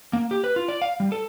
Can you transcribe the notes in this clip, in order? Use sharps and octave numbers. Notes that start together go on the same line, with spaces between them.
A#3
G4
B4
F4
D5
F5
G3
A4